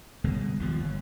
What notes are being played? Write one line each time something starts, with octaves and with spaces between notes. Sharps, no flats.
G1 C2 B2 G#3
D#2 B2 F3
G1